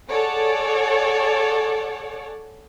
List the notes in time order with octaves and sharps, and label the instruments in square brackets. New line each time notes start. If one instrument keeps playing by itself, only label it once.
[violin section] G#4 A4 C#5 D5 F#5